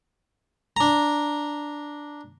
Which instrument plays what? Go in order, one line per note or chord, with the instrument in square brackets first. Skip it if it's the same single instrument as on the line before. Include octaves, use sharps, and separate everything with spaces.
[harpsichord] D4 A#5